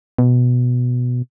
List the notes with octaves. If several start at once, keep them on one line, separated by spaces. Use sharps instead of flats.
B2